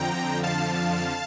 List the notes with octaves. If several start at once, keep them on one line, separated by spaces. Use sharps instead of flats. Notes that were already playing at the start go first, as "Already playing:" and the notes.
Already playing: F2 D3 F3 G5 A#5
F5 A5